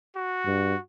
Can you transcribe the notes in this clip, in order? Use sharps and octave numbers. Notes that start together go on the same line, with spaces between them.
F#4
G2